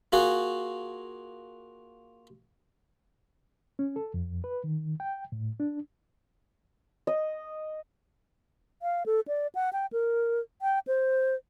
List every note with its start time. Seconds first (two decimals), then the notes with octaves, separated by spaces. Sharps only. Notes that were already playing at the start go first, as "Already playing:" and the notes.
0.12 A#3 F4 F#4 G#4
3.79 C#4
3.96 A4
4.14 F2
4.44 B4
4.64 D#3
5.00 G5
5.32 A2
5.60 D4
7.07 D#5
8.82 F5
9.06 A4
9.28 D5
9.55 F#5
9.73 G5
9.93 A#4
10.62 G5
10.87 C5